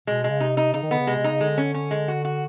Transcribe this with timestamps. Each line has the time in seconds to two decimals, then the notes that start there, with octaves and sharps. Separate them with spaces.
0.07 B2 G#3
0.24 G#3
0.30 C#3
0.40 C3 D#4
0.57 D#4
0.74 C#3 D#4
0.83 D#3
0.90 D3 B3
0.99 C#3
1.07 C3 G#3
1.19 C3
1.24 C#3 D#4
1.41 D3 G#3
1.58 C#4
1.74 C#4
1.91 G#3
2.08 F#4
2.25 F#4